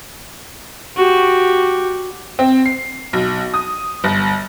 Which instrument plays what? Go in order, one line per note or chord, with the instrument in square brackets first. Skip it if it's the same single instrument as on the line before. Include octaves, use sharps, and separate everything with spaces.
[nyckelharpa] F#4 G4
[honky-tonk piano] C4
C7
B1
D#6
G1